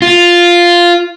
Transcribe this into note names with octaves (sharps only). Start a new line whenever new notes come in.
F4